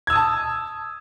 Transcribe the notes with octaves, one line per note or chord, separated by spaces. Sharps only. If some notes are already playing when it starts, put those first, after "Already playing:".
A5 D#6 E6 G#6